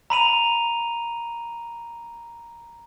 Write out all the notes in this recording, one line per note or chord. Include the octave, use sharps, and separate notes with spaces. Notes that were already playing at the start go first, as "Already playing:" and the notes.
A#5 B5 D#7 F7